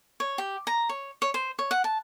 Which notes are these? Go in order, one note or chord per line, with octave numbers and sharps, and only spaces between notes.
C#5
G4
A#5
C#5
C#5
C5
C#5
F#5
A5